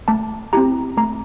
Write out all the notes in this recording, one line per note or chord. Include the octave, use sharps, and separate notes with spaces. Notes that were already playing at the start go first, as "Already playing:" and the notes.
A3 A5
C4 E4 G4 A#5
A3 A#5